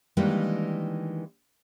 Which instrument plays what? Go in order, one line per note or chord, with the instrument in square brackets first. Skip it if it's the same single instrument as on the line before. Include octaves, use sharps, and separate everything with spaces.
[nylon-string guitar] D#3 E3 G3 G#3 A#3 D4